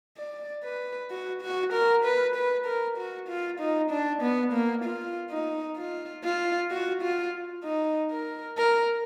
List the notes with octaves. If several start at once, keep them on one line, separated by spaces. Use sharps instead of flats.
D5
B4
F#4
F#4
A#4
B4
B4
A#4
F#4
F4
D#4
D4
B3
A#3
F4
D#4
F4
F4
F#4
F4
D#4
A#4
A#4